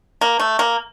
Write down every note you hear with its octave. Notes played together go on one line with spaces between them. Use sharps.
A#3
A3
A#3